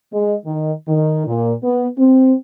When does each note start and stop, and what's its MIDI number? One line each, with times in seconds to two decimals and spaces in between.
0.13 0.34 56
0.46 0.72 51
0.87 1.23 51
1.27 1.53 46
1.63 1.87 59
1.98 2.33 60